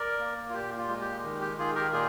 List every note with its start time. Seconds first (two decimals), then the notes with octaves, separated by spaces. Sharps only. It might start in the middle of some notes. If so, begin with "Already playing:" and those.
Already playing: A#4 D5
0.20 A#3
0.50 F4
0.54 A#2 G4
0.78 F4
0.89 G#3
1.01 G4
1.24 D#3
1.41 G4
1.59 D#3 F4 G#4
1.75 G4 A#4
1.92 A#2 F4 G#4